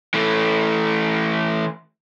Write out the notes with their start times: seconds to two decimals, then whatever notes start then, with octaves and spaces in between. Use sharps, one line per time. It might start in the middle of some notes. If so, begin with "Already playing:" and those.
0.14 E3 A3